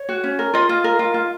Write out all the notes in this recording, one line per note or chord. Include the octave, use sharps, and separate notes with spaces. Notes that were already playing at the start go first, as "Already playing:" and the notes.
Already playing: C#5
F#4
C#4
A#4
F4 D#5
F4
A#4
F4
F4